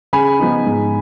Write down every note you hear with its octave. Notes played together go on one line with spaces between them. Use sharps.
C#3 G#5 B5
F3 B3 D#4
G#2